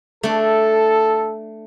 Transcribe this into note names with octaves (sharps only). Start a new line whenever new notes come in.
A3 D4 A4